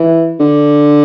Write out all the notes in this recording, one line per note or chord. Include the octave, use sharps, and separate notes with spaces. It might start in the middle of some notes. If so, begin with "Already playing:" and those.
Already playing: E3
D3